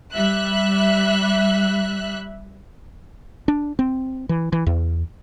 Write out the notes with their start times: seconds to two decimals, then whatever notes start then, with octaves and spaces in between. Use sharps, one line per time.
0.13 G3 E5 F#6
3.48 D4
3.79 C4
4.29 E3
4.52 E3
4.66 E2